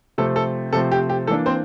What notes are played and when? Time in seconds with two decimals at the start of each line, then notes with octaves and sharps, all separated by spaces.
0.18 C3 F3 A3 C4 A4
0.36 A4
0.73 C3 F3 A3 C4 A4
0.92 G4
1.10 G4
1.27 E3 A#3 D4 A4
1.46 C4 C5